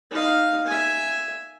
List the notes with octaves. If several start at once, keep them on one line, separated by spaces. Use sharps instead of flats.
D#4 F5
E5 G#5